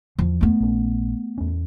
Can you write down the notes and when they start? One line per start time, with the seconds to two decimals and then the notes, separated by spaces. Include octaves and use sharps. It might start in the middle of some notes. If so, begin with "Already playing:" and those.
0.19 E2 F3
0.41 A3 B3
0.60 A#1 C#4
1.38 E2 C#4